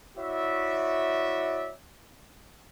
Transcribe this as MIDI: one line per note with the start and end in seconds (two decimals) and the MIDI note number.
0.18 1.72 64
0.18 1.72 66
0.18 1.72 73
0.18 1.72 74
0.18 1.72 76